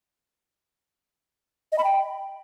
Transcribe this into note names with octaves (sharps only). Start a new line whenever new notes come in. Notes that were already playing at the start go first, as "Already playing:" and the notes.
D#5
B5
G5